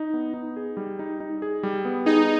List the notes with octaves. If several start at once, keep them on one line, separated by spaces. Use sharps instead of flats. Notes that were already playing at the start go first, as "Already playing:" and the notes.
Already playing: D#4
B3
D#4
G#4
G3
D#4
D#4
G#4
G3
B3
D#4 G#4